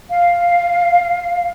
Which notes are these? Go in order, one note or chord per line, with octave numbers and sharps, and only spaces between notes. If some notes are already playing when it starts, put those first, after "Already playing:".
F5